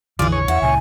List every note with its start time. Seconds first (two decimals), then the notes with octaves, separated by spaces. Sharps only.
0.19 A#1 F2 D3 E3 F4 G#4 D5
0.32 C#5
0.48 E2 E4 F#5
0.62 C#2 A#2 C#3 G#5